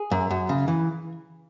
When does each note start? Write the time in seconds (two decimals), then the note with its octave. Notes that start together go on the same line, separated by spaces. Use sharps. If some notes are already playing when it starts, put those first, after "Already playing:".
Already playing: G#4
0.11 F#2
0.31 F#2
0.49 C#3
0.68 E3